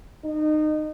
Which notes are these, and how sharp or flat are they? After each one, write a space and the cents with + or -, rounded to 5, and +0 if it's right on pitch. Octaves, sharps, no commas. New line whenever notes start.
D#4 -25